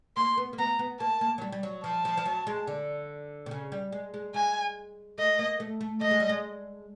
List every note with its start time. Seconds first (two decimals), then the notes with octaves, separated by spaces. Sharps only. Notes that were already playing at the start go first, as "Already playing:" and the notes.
0.16 A#3 C6
0.37 B3
0.53 A#3
0.58 B3 A#5
0.79 B3
1.00 A#3 A5
1.21 A#3
1.38 F#3
1.42 G3
1.52 G3
1.63 F#3
1.84 F3 A5
2.05 F3
2.17 F3
2.26 F#3
2.47 G#3
2.67 D3
3.46 C3
3.51 C#3
3.72 G3
3.92 G#3
4.14 G#3
4.34 G#3 G#5
5.18 A3 D#5
5.39 A#3
5.60 A3
5.81 A3
6.01 A3 D#5
6.11 G#3
6.20 G3
6.29 G#3